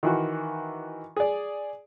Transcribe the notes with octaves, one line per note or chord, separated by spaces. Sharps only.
D#3 E3 F#4
G#4 D5